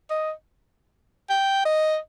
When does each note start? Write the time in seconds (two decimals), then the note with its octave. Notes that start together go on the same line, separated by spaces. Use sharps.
0.10 D#5
1.30 G5
1.65 D#5